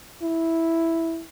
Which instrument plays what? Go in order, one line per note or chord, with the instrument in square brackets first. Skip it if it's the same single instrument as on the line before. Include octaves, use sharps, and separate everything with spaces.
[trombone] E4